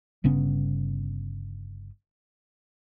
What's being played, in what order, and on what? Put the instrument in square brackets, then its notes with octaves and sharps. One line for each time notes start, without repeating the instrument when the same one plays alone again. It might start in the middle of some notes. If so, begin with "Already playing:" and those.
[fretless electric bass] G1 C#3 B3 C#4